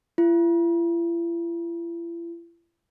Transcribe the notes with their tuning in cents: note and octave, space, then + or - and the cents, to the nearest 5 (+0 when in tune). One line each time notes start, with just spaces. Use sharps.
E4 +45